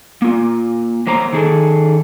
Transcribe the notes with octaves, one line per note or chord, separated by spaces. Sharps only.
A#3 F4
F#3 A#3 C5 A#5
D#3 G#4 A4